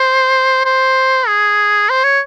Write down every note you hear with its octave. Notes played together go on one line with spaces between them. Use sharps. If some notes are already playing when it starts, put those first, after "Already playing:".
Already playing: C5
C5
G#4
C5
C#5